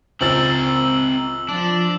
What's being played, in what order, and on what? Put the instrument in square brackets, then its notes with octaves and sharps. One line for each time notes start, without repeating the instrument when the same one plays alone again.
[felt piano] C#2 C5 A6 [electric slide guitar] C4 A#4 [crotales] E6 F#7
[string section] F3 [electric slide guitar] D4